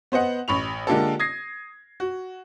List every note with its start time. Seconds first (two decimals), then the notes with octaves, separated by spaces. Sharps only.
0.12 B3 C5 D#5 F#5
0.48 A1 B5 C#6 F7
0.87 D3 G#3 A#3 F4 G4 A4
1.19 D#6 G#6 A#6 C7
2.00 F#4